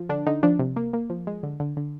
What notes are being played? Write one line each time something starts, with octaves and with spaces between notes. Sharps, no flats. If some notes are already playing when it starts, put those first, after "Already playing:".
Already playing: F3
D3 D4
D3 D#4
F3 D4
C3
A#3
A#3
F3
G#3
D3
D3
D3